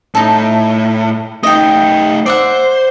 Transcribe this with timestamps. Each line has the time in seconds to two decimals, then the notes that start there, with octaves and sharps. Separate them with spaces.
0.15 A2 D#4 A4
1.43 A3 D#4 D#5 G5
2.26 C5 D5 E5 F#5